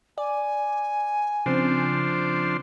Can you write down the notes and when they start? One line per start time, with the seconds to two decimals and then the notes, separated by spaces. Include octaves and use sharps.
0.18 D5 G#5
1.46 C#3 F3 C4 D4 C5